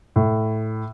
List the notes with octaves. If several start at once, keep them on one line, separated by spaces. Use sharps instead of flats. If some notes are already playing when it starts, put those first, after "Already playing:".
A2